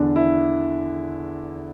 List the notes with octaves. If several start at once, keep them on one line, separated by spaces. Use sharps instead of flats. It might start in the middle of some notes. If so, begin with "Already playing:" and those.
Already playing: E2 D3 D4
E4